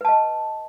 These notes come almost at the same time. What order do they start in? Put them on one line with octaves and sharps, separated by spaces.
B4 A5 D#5